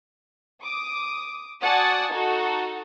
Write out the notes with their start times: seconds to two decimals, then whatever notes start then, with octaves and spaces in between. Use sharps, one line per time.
0.62 D6 D#6
1.62 F#4 D5 F#5 G#5 A5 D#6
2.12 D#4 F#4 A4